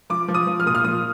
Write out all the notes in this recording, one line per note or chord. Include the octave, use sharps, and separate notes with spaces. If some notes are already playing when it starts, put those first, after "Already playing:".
F3 D6
F3
D#6
F3
F6
A#2 D#6
F6
F3 D#6